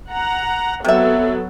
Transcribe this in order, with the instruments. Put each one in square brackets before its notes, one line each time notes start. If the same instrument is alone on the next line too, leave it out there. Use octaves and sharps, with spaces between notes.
[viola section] F#5 A#5
[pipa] C3 E5 [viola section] F#3 B3 A4